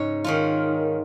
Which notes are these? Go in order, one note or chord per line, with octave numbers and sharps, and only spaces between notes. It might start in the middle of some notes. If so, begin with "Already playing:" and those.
Already playing: G#2 C#3 G#3 C#4 D#4 C#5 D#5
D#3 C#4 F4